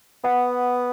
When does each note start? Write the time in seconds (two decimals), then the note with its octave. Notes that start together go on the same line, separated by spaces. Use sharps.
0.24 B3 F#5